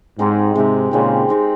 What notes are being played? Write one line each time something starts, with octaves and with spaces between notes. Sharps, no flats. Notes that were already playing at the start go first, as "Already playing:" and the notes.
G#2 G#3 C4 D#4 G4
G#2 C3 G#3 C4 D#4 G4
A#2 C#3 G#3 C4 D#4 G4
G#3 C4 D#4 G4